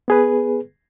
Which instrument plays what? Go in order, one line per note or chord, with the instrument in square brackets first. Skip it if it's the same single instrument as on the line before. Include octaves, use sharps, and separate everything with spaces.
[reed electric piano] B3 G#4 B4